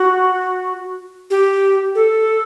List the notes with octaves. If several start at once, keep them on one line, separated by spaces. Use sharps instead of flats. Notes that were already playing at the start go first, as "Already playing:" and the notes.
Already playing: F#4
G4
A4